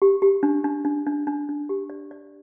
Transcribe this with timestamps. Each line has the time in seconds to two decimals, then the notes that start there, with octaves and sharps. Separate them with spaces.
0.02 G4
0.22 G4
0.43 D4
0.64 D4
0.85 D4
1.06 D4
1.27 D4
1.49 D4
1.69 G4
1.90 D5
2.11 D5